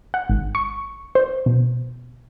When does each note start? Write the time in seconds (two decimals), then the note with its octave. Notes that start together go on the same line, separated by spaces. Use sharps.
0.14 F#5
0.29 G#1
0.55 C#6
1.15 C5
1.46 B2